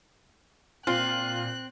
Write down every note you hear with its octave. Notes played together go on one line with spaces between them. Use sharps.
A#2 C4 F4 F#6